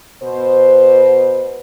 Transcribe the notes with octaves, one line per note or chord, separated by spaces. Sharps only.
B2 B4 C5